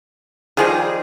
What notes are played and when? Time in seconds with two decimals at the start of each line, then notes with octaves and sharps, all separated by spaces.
0.57 D#3 F3 G3 D#4 G#4